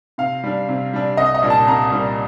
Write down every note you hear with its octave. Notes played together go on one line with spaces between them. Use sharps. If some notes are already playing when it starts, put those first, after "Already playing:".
C3 F5
G3 D4
C3
G3 D4
C2 D#5
D#5
A#2 G3 D4
A5
C2 A#5
A#2 G3 D4